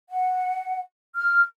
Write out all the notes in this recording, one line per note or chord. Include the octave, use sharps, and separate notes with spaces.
F#5
F6